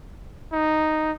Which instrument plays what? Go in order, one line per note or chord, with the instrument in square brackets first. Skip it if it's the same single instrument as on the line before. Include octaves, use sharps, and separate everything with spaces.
[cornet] D#4